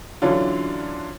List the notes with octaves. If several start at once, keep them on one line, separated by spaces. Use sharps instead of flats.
D3 E3 F#3 C#4 D4 F4